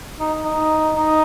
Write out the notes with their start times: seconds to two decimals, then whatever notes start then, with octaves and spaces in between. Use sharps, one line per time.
0.20 D#4
0.45 D#4
0.96 D#4